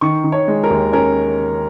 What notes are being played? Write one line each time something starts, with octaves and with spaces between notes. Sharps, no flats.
D#3 C#6
D#3
C#5
G#3
A#4
D#2
C#4 A#4